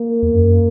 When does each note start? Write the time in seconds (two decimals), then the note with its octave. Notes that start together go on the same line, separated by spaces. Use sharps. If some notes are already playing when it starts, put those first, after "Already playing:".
Already playing: A#3
0.22 E2
0.35 F#2